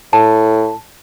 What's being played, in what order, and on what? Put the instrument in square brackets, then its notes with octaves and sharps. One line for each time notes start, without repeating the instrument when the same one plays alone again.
[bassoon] A2 [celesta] A5